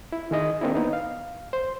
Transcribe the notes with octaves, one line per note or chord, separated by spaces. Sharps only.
E4
D#3 G#4 D#5
D#3 A#3 C4 D4 E4
B3 D#4
F5
C5